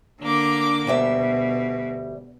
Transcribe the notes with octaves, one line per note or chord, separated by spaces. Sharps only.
D3 A#3 D6
D2 B2 G3 E5